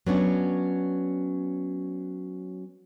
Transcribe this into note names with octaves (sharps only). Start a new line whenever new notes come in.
F#3 B3 C#4 D4